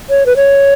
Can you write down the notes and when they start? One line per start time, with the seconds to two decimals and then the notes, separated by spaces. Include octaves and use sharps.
0.10 C#5
0.26 B4
0.36 C#5